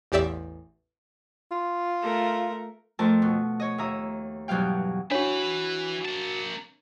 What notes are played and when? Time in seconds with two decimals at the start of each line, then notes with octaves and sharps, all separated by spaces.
0.12 A1 E2 G4 D5 E5
1.51 F4
2.02 A3 A#4
2.99 F2 A3 F4 A#4 A5
3.22 B2
3.60 C#5 D#5
3.78 D#2 E5 A#5 D#6
4.48 E2 G2 B2 F#3 F5 G5
5.11 E3 D4 F#4 B4 C#5 B6
6.06 A#3 A5